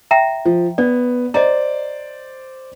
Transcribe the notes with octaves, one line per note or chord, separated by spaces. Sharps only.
E5 G5 A#5
F3
B3 D5
C5 D5 D#5 A#5